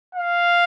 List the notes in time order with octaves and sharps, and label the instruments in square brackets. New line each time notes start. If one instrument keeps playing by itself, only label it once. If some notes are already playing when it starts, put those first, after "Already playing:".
[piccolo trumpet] F5